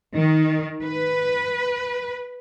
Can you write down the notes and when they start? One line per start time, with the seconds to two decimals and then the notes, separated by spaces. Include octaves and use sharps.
0.14 D#3
0.84 B4